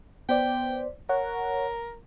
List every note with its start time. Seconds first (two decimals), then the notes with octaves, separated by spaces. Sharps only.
0.29 B3 C5 D5 G5
1.09 A#4 C#5 F#5